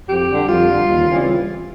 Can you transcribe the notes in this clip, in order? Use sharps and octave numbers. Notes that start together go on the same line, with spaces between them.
F2 G4
D3 G3
F2 F4
D3 G3
D#2
C#3 E3 G3 C4